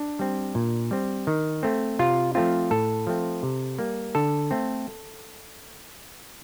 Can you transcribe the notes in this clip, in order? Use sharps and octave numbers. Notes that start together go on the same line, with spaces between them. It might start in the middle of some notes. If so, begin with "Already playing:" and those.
Already playing: D4
G3 C4
A#2
G3 C4
D#3
A3 C4
C3 F4
F3 A3 C4 F4
A2 A4
F3 A3 C4
C3
G3 A#3
D3 A4
A3 C4